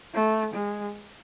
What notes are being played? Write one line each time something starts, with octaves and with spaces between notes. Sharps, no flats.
A3
G#3